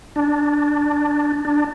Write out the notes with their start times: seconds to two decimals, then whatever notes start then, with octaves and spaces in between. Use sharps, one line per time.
0.16 D4
1.45 D4